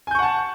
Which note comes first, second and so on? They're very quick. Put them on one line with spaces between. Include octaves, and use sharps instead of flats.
G#5 G6 C#6 F#5 A5